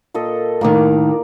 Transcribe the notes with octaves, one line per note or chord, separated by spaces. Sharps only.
A#2 A4 D#5
A2 D#3 A#3 D5 D6